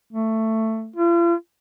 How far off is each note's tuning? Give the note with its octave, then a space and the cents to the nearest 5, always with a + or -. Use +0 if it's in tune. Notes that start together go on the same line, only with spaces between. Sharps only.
A3 +15
F4 -40